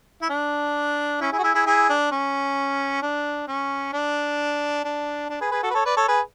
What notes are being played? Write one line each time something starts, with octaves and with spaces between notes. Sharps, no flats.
E4
D4
C#4 E4
E4 G#4
F#4
E4 G#4
E4 G#4
E4 G#4
D4
C#4
D4
C#4
D4
D4
D4
G#4 B4
G#4 B4
F#4 A4
B4
A4 C#5
B4 D5
A4 C#5
G#4 B4